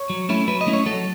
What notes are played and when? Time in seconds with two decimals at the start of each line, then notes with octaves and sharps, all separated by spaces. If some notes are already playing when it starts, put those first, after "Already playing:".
Already playing: C#5
0.10 F#3
0.29 A3 C#4 E4
0.48 F#3 B4
0.61 D#5
0.67 A3 C#4 E4
0.73 C#5
0.86 F#3 A4